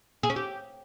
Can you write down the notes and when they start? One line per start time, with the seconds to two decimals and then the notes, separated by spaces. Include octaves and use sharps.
0.23 G#4
0.30 C#4
0.36 G4